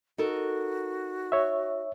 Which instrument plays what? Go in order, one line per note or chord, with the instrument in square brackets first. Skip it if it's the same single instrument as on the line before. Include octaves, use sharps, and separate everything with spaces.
[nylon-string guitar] D#4 A4 A#4 [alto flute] F#4
[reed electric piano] C#5 E5